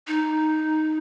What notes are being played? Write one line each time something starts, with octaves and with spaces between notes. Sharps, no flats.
D#4